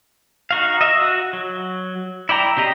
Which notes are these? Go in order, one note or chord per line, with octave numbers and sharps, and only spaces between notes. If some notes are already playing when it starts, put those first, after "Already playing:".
D#4 F#4 F5
D#5 E5
F#4
F#3
E4 D5 G5 A#5
C#3 G4 D#5 A#5